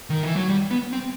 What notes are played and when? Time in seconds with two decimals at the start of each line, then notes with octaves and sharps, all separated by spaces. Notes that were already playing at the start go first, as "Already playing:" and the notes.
0.10 D#3
0.23 E3
0.36 F#3
0.49 G3
0.71 B3
0.93 C4